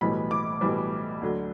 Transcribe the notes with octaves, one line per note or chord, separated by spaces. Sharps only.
B1 A2 E3 G3 B5
D6
B1 A2 E3 G3
D2 D3 F#3